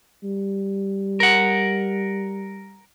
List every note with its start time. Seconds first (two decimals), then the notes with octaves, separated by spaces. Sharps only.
0.24 G3
1.20 A#4 F#5